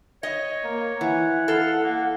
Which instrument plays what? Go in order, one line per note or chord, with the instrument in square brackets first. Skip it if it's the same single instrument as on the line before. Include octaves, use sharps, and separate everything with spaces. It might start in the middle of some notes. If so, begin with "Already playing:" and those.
[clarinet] C#5 [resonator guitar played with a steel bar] D#5
[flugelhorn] A#3
[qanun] E3 [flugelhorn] F#5
[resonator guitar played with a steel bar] A4 [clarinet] F5
[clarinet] A#3